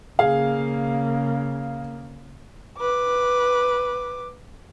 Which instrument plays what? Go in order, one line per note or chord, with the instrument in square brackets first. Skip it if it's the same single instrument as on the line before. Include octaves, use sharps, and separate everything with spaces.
[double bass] C#3 A#3 [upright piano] G#4 F5
[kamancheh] B4 D6